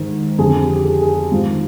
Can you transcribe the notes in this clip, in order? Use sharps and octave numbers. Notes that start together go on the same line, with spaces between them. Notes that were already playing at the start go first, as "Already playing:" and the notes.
Already playing: G#2 D#3
F2 D3 G#4
G4
G4
G#4
G#4
G4
G#2 D#3 F4